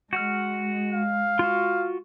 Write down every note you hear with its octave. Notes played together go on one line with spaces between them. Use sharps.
G#3 F#4 F#5 F6
F5
F4 F#4